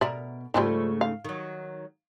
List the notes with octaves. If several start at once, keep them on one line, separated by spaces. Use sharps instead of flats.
B2 A#4 D5 E5
G#2 C#3 E3 F3 G3 A3
F5
D#3 F#3